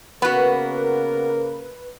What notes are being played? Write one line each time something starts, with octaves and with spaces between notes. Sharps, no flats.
C#3 A#3 B3 F#4 A#4 B4